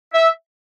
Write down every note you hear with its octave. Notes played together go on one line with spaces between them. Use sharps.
E5